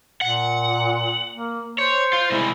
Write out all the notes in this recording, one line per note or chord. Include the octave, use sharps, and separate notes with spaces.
A#2 F#5
A#3
C5 C#5
F4
C3 G3 G#3 E4